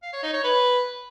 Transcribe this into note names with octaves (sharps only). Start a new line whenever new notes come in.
F5
C#5
D#4
C#5
B4